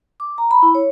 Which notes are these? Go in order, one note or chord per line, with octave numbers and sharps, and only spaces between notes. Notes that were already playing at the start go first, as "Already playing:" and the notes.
D6
A#5
B5
E4
C#5